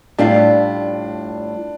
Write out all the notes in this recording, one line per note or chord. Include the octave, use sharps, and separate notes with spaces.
A2 G3 D4 F4 D5 F5